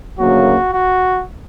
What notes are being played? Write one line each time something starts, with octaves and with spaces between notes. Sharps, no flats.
D2 C#3 F#3 A#3 F#4
F#4